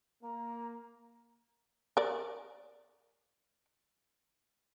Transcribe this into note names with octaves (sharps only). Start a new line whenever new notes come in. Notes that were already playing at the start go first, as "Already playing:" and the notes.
A#3 A#5
A#4 D5